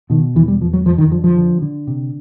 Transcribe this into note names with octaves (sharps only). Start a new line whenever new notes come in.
B2 D#3
E2 E3
G3
E2 F3
F#3
F2 F3
D#3
D3 F3
F3
D3
D3
C3